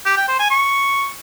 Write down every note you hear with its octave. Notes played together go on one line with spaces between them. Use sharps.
G4
G5
C5
G#5
C#6